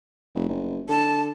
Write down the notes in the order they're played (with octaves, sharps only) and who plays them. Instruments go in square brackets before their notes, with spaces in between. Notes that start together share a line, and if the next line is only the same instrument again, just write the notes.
[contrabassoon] F1
F#1
[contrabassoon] D3 [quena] A5